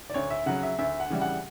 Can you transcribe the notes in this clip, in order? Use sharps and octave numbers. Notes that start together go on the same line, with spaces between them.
D5
D2 C#5
E5
C#3 F#3 F#5
E5
D2 E5
F#5
C#3 E3 G3
F#5